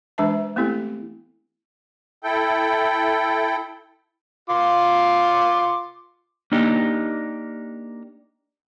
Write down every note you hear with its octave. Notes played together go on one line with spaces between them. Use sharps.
E3 G#3 D4 B4 E5 A5
A3 B3 C4 E4 G4 A4
E4 A4 G5
F4 C6 D6
A#3 D4 D#4 G4